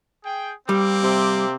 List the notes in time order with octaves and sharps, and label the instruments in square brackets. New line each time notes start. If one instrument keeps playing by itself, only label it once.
[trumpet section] G#4 G5
[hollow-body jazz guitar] G3 [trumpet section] A#3 C4 D6
[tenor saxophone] C3